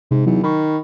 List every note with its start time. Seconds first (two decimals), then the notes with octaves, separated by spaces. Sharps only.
0.11 G#2 C3
0.26 E2 F#3 D#4
0.43 D#3 B5 C#6